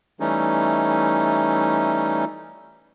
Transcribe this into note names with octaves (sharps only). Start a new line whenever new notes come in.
E3 G3 A3 C#4 D#4